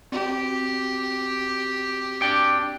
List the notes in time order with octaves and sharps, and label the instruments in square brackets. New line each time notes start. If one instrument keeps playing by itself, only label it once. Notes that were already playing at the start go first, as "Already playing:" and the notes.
[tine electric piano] C4 F#4 [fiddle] G4
[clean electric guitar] D4 G5